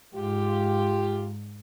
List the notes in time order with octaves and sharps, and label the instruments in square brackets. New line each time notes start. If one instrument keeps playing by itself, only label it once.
[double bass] G#2 [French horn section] F4 G4